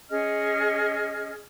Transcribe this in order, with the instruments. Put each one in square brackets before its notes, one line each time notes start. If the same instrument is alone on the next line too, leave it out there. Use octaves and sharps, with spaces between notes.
[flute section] C#4 G#4 D#5 F6